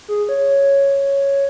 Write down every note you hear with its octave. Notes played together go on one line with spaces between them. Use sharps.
G#4
C#5